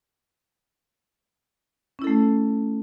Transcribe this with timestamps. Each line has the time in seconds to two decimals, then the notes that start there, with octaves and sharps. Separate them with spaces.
1.99 C#4
2.02 E4
2.04 A4
2.07 A3